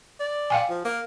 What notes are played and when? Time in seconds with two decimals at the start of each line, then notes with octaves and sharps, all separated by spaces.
0.20 D5
0.50 F5 G5 G#5
0.69 F3
0.85 A#3